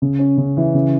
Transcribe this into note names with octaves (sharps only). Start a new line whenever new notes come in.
C#3
C#4
C#3
E3
C#3